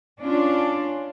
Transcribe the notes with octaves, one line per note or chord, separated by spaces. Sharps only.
C#4 D4 F4